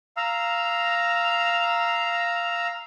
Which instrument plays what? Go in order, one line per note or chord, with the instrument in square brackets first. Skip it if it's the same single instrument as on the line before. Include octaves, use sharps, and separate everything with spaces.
[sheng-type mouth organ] F5 A#5 E6